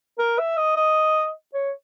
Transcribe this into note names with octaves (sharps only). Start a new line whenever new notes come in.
A#4
E5
D#5
D#5
C#5